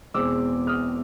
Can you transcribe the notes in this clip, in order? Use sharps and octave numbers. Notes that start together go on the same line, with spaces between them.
E2 B2 G#3 C4 D6 E6
D#6 F6